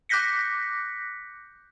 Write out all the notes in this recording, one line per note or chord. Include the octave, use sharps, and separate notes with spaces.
D6 F#6 G6 A#6 B6 C#7